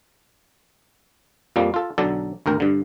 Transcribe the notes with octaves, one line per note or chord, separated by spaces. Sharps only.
F2 F3 G3 A#3
F4 A4
B1 D3 F#3 A4 D5
G#1 D2 A#4 G5
G2 D3